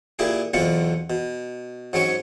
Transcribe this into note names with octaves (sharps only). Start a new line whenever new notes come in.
A#2 E4 G4 G#4
B1 E2 B2 C4 F4 F#5
B2
G#2 F#3 C4 C#4 C#5